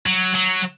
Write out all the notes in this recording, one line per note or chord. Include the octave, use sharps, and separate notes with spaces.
F#3
F#3